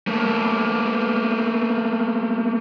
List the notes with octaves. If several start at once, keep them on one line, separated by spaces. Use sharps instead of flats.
A3 A#3